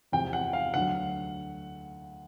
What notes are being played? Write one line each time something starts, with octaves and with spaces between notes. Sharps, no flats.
E2 C3 F3 G5
F#5
F5
D2 D3 F#3 F#5